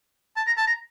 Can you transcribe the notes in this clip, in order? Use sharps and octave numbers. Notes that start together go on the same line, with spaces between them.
A5
A#5
A5
A#5